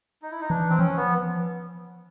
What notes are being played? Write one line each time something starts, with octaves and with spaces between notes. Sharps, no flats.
D#4
E4
D#4
E3 D4
C4
F3 C#4
B3